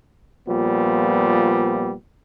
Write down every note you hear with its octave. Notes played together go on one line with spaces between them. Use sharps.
A#2 F3 G3 B3